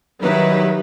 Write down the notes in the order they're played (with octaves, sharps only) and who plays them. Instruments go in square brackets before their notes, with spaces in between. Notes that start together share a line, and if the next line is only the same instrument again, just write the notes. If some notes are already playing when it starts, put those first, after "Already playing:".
[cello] D#3 E4 [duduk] F#3 [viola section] G3 D#4 B4